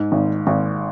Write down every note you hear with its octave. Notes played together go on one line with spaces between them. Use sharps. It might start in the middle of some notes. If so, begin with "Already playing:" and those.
Already playing: G#2
G#1
G#1